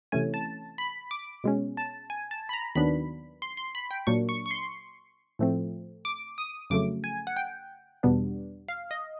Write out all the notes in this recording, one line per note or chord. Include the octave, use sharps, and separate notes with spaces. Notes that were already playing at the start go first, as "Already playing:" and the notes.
C3 E3 A3 C#4 G#5
A5
B5
D6
B2 G#3 C#4
A5
G#5
A5
B5
A#5
D#2 D#3 F#3 B3 D4 B5
C6
C6
B5
G5
A#2 F#3 A#3 D4 C#6
C#6
C#6
C6
A2 F3 A3 C4
D6
D#6
F2 C#3 F#3 A3 D6
G#5
F#5
G5
E2 B2 G3 B3 D4
F5
D#5